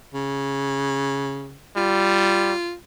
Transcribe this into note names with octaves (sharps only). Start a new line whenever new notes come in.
C#3
G3 F4